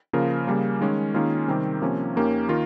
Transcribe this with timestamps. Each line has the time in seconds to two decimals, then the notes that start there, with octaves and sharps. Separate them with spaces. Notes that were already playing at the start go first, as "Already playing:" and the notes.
0.13 C#3 F3 A#3 F4 A#4
0.47 C#3 G3 A#3
0.81 D#3 G#3 C#4
1.14 D#3 A#3 C#4 F4 G#4
1.48 C3 D#3 G3 C4 G4
1.82 C3 F3 A#3 C#4
2.16 D#2 D#3 A#3 C#4 G4
2.49 D#3 A#3 F4 A#4